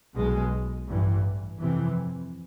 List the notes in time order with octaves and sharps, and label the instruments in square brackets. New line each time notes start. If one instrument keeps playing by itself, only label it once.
[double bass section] B1 B2 G#3
A1 G2 E3
F2 C3 E3